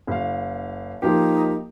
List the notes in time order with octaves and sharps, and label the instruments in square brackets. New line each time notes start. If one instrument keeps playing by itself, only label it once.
[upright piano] F#1 F5
[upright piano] F3 A#3 G4 [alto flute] D#4